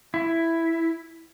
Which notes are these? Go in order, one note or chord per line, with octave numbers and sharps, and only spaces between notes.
E4